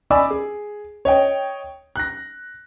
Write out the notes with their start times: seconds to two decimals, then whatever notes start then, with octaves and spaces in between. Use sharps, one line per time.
0.11 D5 D#5 G#5 B5 D6 E6
0.31 G#4
1.05 C#5 D#5 G5
1.96 F#6 A#6